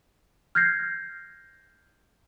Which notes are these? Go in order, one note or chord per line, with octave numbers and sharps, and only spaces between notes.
F6 G6 G#6 A#6 C7